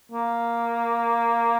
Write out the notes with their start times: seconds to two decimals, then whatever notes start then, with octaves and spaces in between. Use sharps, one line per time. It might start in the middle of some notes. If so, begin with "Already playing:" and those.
0.12 A#3